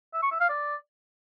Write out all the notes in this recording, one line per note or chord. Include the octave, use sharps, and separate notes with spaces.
E5
C#6
E5
F5
D5